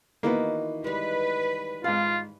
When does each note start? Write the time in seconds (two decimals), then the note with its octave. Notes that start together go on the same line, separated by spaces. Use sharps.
0.23 D#3 E3 A#3 B3 F#4
0.84 G3 G#3 B4
1.84 G#2 F4 B4 F5